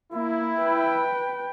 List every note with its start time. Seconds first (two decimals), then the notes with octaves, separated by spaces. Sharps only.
0.13 A#3 E4
0.58 B4 G5